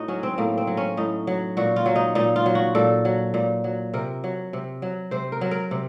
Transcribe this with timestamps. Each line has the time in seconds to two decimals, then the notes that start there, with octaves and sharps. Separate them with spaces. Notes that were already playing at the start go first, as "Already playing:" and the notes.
Already playing: A2 D#4 F#4
0.08 F#3 C#4
0.23 C4
0.38 A2 A#3
0.58 C4
0.67 F#3
0.77 C#4
0.97 A2 D#4
1.27 F#3
1.57 A#2 F#4
1.76 F4
1.86 F#3
1.96 D#4
2.15 A#2 D#4
2.36 F4
2.46 F#3
2.55 F#4
2.75 A#2 A4
3.05 F#3
3.34 A#2
3.64 F#3
3.94 C3 A#4
4.24 F#3
4.53 C3
4.82 F#3
5.11 C3 C5
5.32 A#4
5.41 F#3
5.51 A#4
5.71 C3